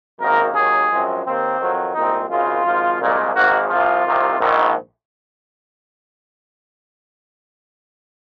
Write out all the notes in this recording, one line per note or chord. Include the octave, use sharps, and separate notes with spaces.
G#1 F#2 D#3 A#3 A#4
D#2 D#3 F#3 G#4
F#2 F3 G#3 C4
D#2 D#3 A#3 C4
F2 D#3 F#3
C2 A#2 G#3 C4 D#4
G#1 F#2 C#3 G#3 F4
G#1 G#2 F3
C2 A#2 G#3
G#1 G#2 D#3 A#3 F#4
C2 C3 F3 F4
C2 C3 D#3
A#1 G#2 D#3